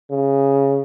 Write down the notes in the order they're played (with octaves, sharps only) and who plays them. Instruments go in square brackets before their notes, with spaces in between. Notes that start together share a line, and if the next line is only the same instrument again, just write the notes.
[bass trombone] C#3